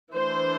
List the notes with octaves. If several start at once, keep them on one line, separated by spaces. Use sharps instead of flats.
E3 A3 D4 C5